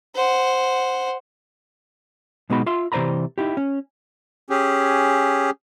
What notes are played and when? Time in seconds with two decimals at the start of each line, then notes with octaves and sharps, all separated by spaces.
0.15 C5 F#5
2.50 B2 G#3 B3 D#4 F#4 B5
2.66 F4 E5 C6
2.92 C3 E3 C5 D5 A#5 B5
3.38 D#4 E4 G4
3.57 C#4
4.50 C#4 G4 G#4